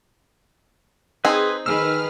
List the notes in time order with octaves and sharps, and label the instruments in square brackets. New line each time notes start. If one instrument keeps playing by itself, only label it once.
[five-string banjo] C4 D#4 [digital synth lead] G#4 [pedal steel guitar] B4 C6
[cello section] D#3 G#4 B4 [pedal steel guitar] E6 [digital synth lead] F6